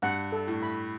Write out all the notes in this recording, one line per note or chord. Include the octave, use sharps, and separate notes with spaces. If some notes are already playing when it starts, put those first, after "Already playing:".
G2 F#5
A4
A2
B5